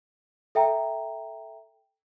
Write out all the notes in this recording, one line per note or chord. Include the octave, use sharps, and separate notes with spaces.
A4 E5 G5 A#5